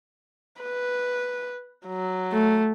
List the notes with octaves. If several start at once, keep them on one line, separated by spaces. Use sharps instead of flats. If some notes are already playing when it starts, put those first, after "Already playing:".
B4
F#3
A3